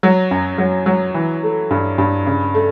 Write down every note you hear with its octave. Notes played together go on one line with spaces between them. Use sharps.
F#3
F#2
F#3
F#3
E3
A3
G2
G2
C#3
A3